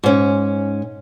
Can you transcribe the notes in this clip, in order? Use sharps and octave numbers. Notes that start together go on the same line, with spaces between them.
G#2 C#4